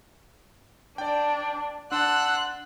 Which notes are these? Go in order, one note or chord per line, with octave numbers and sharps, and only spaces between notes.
D4 D5 G5
D4 F#5 A5 C6 E6 F#6